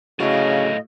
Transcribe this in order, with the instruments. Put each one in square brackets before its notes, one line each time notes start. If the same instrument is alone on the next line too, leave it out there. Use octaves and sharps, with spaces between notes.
[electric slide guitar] A2 A4 F5 [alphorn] C#3 [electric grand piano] A3 E4 F#4 [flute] D#5